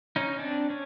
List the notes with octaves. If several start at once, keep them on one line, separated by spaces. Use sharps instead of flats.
C#4 D#4
C4 D4
C#4